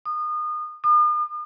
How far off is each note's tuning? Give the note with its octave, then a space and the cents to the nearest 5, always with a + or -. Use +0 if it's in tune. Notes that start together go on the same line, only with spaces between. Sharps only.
D#6 -30
D#6 -45